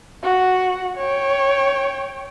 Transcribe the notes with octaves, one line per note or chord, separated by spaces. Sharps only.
F#4 F#5
C#5 G5